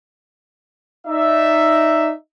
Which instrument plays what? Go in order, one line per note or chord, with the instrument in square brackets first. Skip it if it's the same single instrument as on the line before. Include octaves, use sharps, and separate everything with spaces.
[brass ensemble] D#4 D5 E5